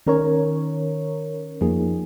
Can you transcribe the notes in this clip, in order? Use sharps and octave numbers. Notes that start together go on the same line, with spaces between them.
D#3 C#4 A#4 C#5
F2 F3 A#3 D#4 G#4